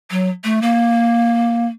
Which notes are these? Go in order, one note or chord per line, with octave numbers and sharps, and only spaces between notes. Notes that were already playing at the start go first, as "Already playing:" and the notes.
F#3
A3
A#3